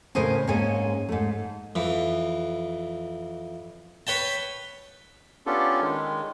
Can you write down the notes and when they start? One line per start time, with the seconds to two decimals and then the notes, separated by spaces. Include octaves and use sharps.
0.15 A2 C#3 A#4 C5 D#5 G#5
0.47 G#2 G#3 A#3 C#4 G#5
1.09 G#2 A3
1.75 F2 E3
4.07 B4 C#5 G5 A5
5.46 B3 C#4 D4 F4 G4 A4
5.82 D#3 G#3